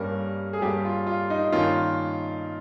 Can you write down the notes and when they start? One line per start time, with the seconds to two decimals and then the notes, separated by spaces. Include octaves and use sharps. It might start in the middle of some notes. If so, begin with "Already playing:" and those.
Already playing: G2 G3 A#3 C#4 A#4
0.53 G#4
0.61 G2 G3 A#3 C#4 G4
0.85 F4
1.07 F4
1.30 D#4
1.52 G2 D#3 A#3 C#4 F4